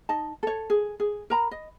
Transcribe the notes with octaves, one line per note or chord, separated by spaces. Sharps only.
D#4 D#5 A5
A4 C#5
G#4
G#4
A#4 A#5 B5
D#5